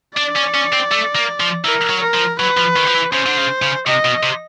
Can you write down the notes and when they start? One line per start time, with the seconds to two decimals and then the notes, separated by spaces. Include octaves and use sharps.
0.17 D4 D5
0.36 C#4
0.54 C#4
0.73 C4
0.92 A3
1.16 A#3
1.40 F3
1.65 E3 A#4
1.90 F#3
2.02 A#4
2.14 F3
2.40 F#3 B4
2.57 F3
2.76 D#3
2.87 F3
2.94 E3
3.12 C#3 C5
3.26 D3
3.37 C#3
3.62 C#3
3.87 C3 D#5
4.05 B2
4.23 C3